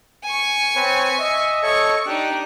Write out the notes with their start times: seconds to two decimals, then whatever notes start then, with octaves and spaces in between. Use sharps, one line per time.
0.25 G#5 C#6
0.76 C4 B4 C#5
1.19 D#5 E5
1.63 A4 C#5 D#5 C#6
2.06 D4 D#4 G4 F#6